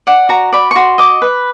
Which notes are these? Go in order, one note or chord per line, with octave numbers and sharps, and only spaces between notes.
D5 F#5
F#4 A#5
D5 B5
C#6
F#4 C6
D#5 D6
B4